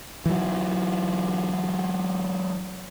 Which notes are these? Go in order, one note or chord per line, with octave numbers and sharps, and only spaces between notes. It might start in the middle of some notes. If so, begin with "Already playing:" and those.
E3 F#3